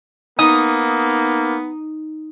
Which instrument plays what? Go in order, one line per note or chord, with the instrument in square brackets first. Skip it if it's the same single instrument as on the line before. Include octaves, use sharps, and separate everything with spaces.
[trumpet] A#3 [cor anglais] B3 [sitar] D#4 [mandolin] D#6